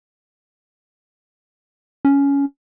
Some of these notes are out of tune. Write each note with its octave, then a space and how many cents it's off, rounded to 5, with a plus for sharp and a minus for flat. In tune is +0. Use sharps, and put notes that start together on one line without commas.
C#4 +15